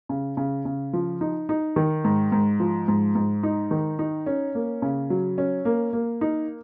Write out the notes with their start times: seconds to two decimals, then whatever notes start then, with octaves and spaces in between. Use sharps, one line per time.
0.09 C#3
0.37 C#3
0.65 C#3
0.93 F3
1.21 D#4
1.49 D#4
1.76 D#3
2.04 G#2
2.32 G#2
2.60 F3
2.88 G#2
3.15 G#2
3.43 D#4
3.71 D#3
3.99 D#4
4.26 C#4
4.55 A#3
4.82 C#3
5.10 F#3
5.38 C#4
5.65 A#3
5.93 A#3
6.21 D#4